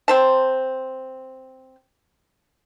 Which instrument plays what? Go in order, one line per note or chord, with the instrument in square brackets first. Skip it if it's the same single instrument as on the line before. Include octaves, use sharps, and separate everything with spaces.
[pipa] C4 C5 A5